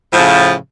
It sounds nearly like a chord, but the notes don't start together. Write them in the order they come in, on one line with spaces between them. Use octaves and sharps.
A2 F3 C#3